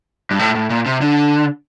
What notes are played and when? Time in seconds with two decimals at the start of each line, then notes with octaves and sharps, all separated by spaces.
0.31 G2
0.39 A2
0.55 A2
0.70 A#2
0.86 C3
1.01 D3